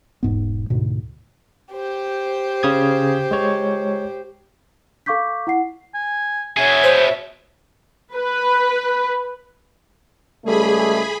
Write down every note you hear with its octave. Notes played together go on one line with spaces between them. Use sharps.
E1 G#2 B3
D2 G#2 B2
G4 C5
C#3 D#6 G#6
G#3 C#5
A4 F5 C#6 D6 G6 B6
E4 F#5 C7
G#5
B2 G#4 C#5 E5 G#5
C5
B4
C#2 G3 A3 G#4 B5